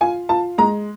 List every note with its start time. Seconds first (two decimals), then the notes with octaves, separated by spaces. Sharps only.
0.01 F4 G#5
0.29 F4 A5
0.58 G#3 A#5